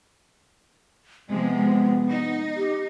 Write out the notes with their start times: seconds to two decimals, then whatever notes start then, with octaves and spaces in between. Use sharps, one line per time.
1.30 C3 F3 G#3 B3
2.08 D#4
2.57 G4